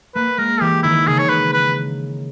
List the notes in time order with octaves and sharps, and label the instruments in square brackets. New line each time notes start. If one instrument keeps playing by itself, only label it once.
[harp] A#3 [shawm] B4
[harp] G#3 [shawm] A#4
[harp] E3 [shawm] G4
[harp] D#3 [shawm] E4
[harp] C#3 [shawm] G#4
[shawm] C#5
B4
B4